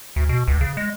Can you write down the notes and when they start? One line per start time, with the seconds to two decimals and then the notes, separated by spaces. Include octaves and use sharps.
0.16 D2
0.29 B2
0.48 C#2
0.61 C#3
0.77 G#3